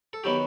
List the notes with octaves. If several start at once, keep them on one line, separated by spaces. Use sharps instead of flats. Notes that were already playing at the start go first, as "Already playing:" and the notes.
A4
D#3 F#3 B3 G4